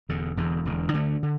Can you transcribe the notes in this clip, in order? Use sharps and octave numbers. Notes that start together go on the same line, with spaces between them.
E1 E2 D3
E1 E2 D3
E1 E2 D3
D2 D3 A3 D4
D3